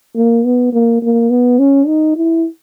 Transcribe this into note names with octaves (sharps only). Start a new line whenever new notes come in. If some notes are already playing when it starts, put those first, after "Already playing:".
A#3
B3
A#3
A#3
B3
C#4
D#4
E4